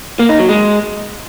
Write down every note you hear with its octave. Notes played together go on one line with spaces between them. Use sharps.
A#3
D#4
F#3
G#3